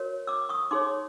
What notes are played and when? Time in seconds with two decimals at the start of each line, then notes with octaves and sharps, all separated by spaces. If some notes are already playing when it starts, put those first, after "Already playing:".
Already playing: F#4 A#4 C#5
0.27 D6 E6
0.49 C#6 D#6
0.71 D#4 G#4 C#5 C6 D6